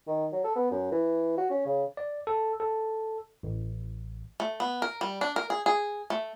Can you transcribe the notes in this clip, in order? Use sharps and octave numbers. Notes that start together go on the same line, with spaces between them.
D#3
F#3
A4
B3
F#2
E3
F#4
C#4
C#3
D5
A4
A4
A1
A3
B3
A#4
G3
D4
A#4
G#4
G#4
A3